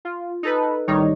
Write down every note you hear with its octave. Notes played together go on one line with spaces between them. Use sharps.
F4
D#4 A4 B4
A1 D#3 G3 D#4 C#5